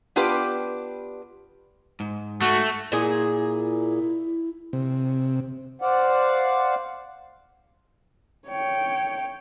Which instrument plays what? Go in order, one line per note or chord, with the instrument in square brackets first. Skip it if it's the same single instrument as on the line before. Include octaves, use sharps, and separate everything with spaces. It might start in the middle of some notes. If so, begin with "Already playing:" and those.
[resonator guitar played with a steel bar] B3 D4 F4 G4 B4
[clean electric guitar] G#2
[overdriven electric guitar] A3 [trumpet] F#4
[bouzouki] A#2 G#4 [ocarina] E4
[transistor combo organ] C3
[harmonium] C5 D5 F5 F#5
[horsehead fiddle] C#5 G5